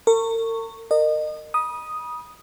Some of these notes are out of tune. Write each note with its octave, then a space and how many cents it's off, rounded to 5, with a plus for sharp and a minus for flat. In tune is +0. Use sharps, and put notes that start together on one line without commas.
A#4 -45 C#6 +0
A#4 -25 D#5 -30
B5 -35 D#6 +0